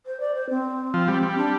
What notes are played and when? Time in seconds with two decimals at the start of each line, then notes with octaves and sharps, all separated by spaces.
0.06 C5
0.20 D5
0.34 C5
0.49 C4
0.94 F3
1.08 G3
1.23 G3
1.37 D4